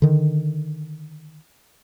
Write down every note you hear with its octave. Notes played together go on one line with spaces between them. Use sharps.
D3 D#3